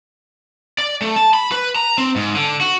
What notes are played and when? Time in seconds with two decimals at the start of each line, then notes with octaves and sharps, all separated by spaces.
0.78 D5
1.02 A3
1.16 A5
1.34 B5
1.52 B4
1.76 A#5
1.98 C4
2.16 G#2
2.35 D3
2.61 F#4